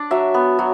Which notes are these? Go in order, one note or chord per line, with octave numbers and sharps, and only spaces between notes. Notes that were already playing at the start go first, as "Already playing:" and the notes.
Already playing: D4 D5
F#3 E5
B3
F#3